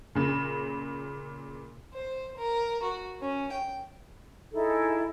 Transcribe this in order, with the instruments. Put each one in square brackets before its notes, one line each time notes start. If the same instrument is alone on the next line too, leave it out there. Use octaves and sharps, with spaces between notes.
[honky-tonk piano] A#2 C#3
[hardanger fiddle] C5
A#4
F#4
C#4
G5
[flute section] D#4 E4 G#4 A4